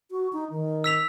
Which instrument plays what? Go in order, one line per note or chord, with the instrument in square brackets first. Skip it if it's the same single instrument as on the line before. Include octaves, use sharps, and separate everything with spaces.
[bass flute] F#4
D#4
D#3
[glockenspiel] E6 B6 F7